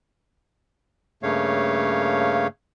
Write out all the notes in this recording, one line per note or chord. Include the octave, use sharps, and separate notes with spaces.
G2 C#3 A3 A#3 C#5 F5